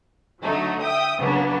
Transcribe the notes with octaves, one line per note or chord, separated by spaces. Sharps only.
D3 F#3 A3 D#4
E5 G5 D#6
C#3 F#3 A#3 B3 D4